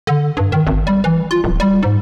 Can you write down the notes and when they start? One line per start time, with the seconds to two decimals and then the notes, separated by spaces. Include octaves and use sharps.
0.07 D3
0.37 G2
0.52 D#3
0.67 G#1
0.87 G3
1.04 E3
1.31 F4
1.44 D1
1.60 G3
1.83 G#2